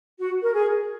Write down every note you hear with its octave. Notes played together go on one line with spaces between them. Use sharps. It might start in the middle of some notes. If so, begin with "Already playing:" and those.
F#4
A#4
G#4